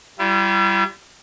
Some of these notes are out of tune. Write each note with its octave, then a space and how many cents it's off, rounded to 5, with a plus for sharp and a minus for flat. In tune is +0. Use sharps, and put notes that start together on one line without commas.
G3 -20 E4 +45